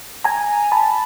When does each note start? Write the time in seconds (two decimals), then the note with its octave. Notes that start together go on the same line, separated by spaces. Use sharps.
0.24 G#5 A#5
0.72 A5 B5